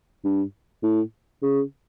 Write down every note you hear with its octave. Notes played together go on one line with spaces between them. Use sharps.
G2
A2
C#3